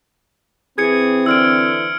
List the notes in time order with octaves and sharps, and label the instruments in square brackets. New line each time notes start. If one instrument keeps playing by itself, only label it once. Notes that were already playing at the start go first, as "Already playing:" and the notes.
[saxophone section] E3 G#4 [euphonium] C4 [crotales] G#6 C#7
[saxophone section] D3 E3 [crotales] E6 F6 D7